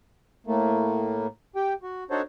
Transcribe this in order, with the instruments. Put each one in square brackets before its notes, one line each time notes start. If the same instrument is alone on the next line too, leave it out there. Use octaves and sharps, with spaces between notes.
[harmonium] A2 A3 A#3
G4 G5
F#4
D4 D#4 F#4 A4 C5 C#5